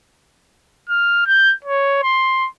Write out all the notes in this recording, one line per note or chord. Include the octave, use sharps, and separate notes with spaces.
F6
G6
C#5
C6